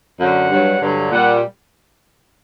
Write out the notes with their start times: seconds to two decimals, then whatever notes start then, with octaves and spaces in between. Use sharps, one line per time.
0.19 F#2 D3 F#3 F#5
0.51 G2 F#3
0.81 G2 D3 F#3
1.10 A#2 G3 F#5